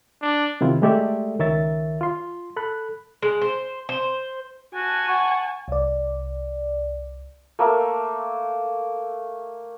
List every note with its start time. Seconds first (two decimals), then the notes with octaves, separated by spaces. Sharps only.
0.22 D4
0.61 C3 D#3 E4 F4
0.82 G#3 A3 G4 A4 D5 E5
1.39 C#2 D#3 A#4 C#5 E5 A6
2.01 F4 C6
2.57 A4 B5 F#6
3.22 G#3
3.42 C5
3.89 C5
4.74 F#4 G#5 A5
5.08 F#5 C#6
5.68 C2 D5
7.59 A3 A#3 E6